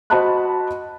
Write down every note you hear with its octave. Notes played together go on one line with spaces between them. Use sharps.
F#4 C5 D#5 A5 B5 F#6